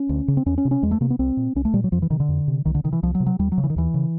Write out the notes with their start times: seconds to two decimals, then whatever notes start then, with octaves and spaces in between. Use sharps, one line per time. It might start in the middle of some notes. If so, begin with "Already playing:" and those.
Already playing: C#4
0.09 D2
0.28 C#3
0.37 C4
0.46 E2 C#4
0.58 C#4
0.65 C3
0.71 C#4
0.83 E2 G#3
0.91 A3
1.01 C3 A#3
1.10 B3
1.19 C2 C4
1.37 A#2
1.55 C2 C#4
1.65 A3
1.73 A#2 G3
1.84 F#3
1.92 F2 F3
2.02 E3
2.10 C3 D#3
2.20 D3
2.29 F2
2.48 C3
2.65 C2 D#3
2.75 D3
2.84 C3 D#3
2.93 E3
3.03 C2 F3
3.15 F#3
3.20 C3
3.26 F#3
3.39 D#2 G3
3.52 F#3
3.58 C#3
3.64 E3
3.70 D#3
3.76 D#2 E3
3.94 C#3